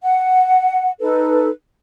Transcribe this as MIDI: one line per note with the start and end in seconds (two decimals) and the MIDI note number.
0.02 0.89 78
1.00 1.49 63
1.00 1.49 69
1.00 1.49 71